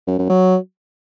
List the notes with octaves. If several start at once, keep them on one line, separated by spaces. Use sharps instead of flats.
F#2
F#2
F#3